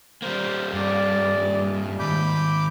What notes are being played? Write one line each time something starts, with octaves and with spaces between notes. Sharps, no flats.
G3 A#3 C5
G2 D5
G#2 D#3 B5 D6 G6